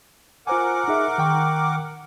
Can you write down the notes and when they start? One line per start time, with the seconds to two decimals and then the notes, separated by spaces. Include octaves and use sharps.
0.47 F4 A#4 C5 F#5 G#5 D6
0.88 D#4 G#4 E5
1.18 D#3 G5 C#6